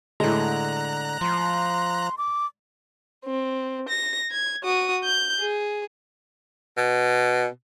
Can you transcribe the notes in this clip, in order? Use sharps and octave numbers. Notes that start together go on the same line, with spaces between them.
A2 D3 G#3 A#5 F#6
F3 C6
D6
C4
A#6
G#6
F#4 D#6
G6
G#4
B2